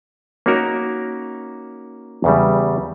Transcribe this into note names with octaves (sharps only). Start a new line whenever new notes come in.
A#3 C#4 D#4 F#4 A#4
E2 C#3 G3